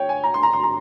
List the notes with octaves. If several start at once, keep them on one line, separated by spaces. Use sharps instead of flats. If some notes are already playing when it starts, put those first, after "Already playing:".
Already playing: C#5 G5
G#5
A#5
C6
A#5
C6
A#5